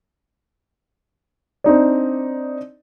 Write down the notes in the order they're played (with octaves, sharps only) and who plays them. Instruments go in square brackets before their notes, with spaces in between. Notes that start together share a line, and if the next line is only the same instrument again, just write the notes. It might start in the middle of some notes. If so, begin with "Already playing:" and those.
[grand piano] C4 D4 D#4 D5